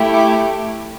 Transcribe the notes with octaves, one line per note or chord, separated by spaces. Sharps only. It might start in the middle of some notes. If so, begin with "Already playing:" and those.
Already playing: A3 E4 G4
D6